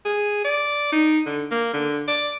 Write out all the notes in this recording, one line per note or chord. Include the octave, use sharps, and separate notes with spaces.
G#4
D5
D#4
D3
A#3
D3
D5